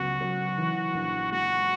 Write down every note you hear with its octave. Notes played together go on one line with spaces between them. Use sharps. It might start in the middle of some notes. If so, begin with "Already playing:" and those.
Already playing: C#2 F#3 B3 F#4
F#3
E3
A#1
G#3 F#4